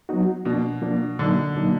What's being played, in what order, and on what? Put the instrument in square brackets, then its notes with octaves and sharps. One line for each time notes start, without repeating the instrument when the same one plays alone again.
[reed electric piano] F#3 B3 D#4 F#4
[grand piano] B2 [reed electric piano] F3 A#3 D4
[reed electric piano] F3 A#3 D4
[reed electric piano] A#2 F#3 A#3 D#4 [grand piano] D3
[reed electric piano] A#2 F#3 A#3 D#4